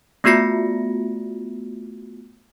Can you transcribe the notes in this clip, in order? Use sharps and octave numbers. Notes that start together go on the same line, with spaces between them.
A3 B3 F4 F#4 A#6 C#7